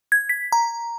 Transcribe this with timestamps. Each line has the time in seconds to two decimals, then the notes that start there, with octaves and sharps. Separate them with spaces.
0.12 G#6
0.29 B6
0.52 A#5